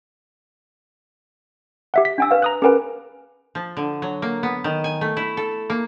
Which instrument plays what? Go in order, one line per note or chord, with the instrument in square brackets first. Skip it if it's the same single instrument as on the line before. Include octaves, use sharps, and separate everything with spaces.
[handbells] G4 E5 F#5
B6
[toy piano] D4 G#5 E6
B4 F5
[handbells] A#5 D#6 F#6
[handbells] C#4 A#4 B4 [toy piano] G#4 G#5
[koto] F3
D3
F#3
A#3
B3
D#3
G#5
A3
E4
A4
A#3